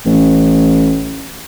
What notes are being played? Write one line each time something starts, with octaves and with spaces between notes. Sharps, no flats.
A1